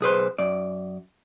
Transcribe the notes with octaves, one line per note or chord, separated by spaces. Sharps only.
B1 G#4 B4 C5
F#2 D5